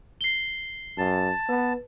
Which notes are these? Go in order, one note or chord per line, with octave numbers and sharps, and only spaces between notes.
C7 G7
F#2 A5
B3 B4